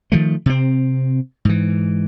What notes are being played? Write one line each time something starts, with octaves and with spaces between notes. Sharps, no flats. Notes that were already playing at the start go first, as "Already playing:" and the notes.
D#3 F3 A3
C3 C4
G#2 E3